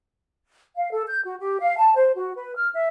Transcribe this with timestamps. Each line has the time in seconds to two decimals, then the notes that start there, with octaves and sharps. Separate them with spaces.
0.76 F5
0.91 A4
1.07 G6
1.25 F#4
1.39 G4
1.61 F5
1.78 A5
1.95 C5
2.16 F#4
2.34 B4
2.56 F6
2.74 E5